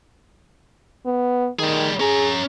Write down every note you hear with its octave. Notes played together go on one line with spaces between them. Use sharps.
B3
D#3 G3 G#4
C#4 G#4 A#5